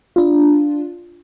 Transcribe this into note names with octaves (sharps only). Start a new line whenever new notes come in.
D4 F4